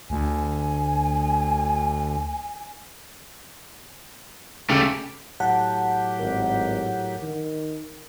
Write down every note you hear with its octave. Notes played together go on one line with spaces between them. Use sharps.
D2 G#5
C#3 A3 G4
A2 F#3 G4 F#5 A5
G#1 A#4
D#3